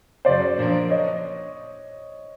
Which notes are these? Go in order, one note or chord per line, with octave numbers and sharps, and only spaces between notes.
F#2 C#3 F#3 C5 D5
A#2 F3 A#3 D4
C#5 D#5